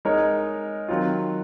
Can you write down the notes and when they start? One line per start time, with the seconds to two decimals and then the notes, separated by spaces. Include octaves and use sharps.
0.05 G#3 D#4 A#4 C#5
0.88 D#3 F#3 C4 F4